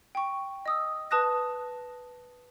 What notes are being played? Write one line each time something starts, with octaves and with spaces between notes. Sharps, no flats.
G5 C#6
D#5 D#6 E6
B4 A5 D#6 F#6 A#6